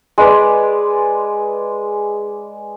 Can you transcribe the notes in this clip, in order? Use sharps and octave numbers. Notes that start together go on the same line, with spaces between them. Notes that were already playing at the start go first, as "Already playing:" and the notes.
G#3 B4 D5